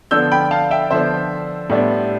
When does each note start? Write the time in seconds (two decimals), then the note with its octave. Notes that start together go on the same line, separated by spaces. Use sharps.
0.11 D3 F3 B3 D4 E6 G6
0.32 G5 B5
0.51 F5 A5
0.71 E5 G5
0.90 D3 F3 B3 D4 C5 E5
1.69 A2 G3 B3 D4